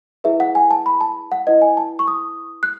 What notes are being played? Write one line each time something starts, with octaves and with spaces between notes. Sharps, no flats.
E4 G#4 B4 E5
F#5
G#5
A5
B5
A5
F#5
E4 B4 D#5
G#5
A5
C#6
D#6
F#6